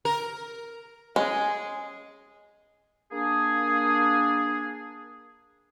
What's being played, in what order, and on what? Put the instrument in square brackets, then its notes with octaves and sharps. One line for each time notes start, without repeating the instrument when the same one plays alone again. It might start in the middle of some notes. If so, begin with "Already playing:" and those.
[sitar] A#4
[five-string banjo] G#3 [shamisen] C#4 [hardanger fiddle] G#4
[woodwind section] A#3 D4 G#4